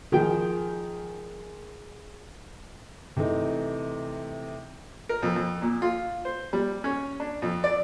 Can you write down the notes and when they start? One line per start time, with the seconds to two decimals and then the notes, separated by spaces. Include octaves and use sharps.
0.12 D#3 F3 G#4 G5
3.16 C3 E3 A3 D#4
5.09 A#4
5.22 F2
5.36 F2
5.62 A#2
5.82 F4
6.25 C5
6.53 G3
6.84 C#4
7.20 D4
7.42 F2
7.64 D5